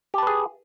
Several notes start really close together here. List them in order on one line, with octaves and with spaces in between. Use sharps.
G4 A5 B4 G#4